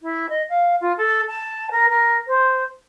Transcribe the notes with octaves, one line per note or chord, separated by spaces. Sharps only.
E4
D#5
F5
F4
A4
A5
A#4
A#4
C5